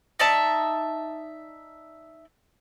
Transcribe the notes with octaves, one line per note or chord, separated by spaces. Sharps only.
D#4 D5 E5 A5